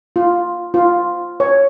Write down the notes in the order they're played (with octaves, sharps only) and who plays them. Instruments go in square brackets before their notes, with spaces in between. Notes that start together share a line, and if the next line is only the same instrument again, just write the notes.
[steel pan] F4
F4
C#5